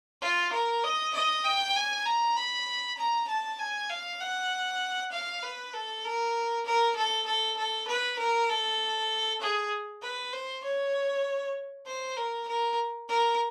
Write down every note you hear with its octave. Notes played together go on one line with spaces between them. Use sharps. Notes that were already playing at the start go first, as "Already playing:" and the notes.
F4
A#4
D#5
D#5
G5
G#5
A#5
B5
A#5
A5
G#5
F5
F#5
F5
B4
A4
A#4
A#4
A4
A4
A4
B4
A#4
A4
G#4
B4
C5
C#5
C5
A#4
A#4
A#4